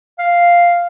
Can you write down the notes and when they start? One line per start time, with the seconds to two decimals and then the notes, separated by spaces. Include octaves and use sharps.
0.19 F5